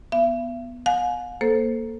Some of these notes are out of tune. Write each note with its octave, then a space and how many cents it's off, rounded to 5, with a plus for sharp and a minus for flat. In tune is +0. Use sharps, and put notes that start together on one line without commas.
B3 -5 E5 +45
F5 +45 G#5 +20
A#3 +0 A4 +0 C5 +0